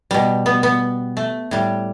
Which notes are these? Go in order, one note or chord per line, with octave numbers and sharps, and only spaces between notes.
B2 G3
B3
B3
A3
A2 G3